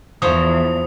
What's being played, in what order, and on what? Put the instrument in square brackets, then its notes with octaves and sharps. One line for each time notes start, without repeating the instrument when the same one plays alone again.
[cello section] E2 [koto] F3 C5 C#5 [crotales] D#6